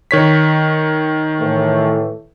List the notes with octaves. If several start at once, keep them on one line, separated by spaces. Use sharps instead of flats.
D#3 C#5 B6
A2 E3 A3